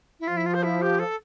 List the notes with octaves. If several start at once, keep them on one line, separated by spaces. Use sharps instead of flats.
E4
F3 F4
E4
F4
C5
E4
G4
A4